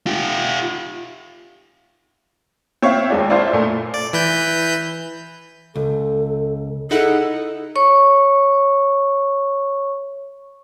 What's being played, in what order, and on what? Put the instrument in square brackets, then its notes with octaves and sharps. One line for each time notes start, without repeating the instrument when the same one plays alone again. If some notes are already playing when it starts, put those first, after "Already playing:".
[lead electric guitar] F4 G4
[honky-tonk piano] C4 C#5 E5 F5
D#2 G#3 D4
D4 E4 F4 C5
A#2 A3
[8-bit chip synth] D5
E3 B4 G6
[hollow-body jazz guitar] C#2 [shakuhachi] A4
[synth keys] D#4 E4 F#5 [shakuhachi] G#4 [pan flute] A4
[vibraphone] C#5 C#6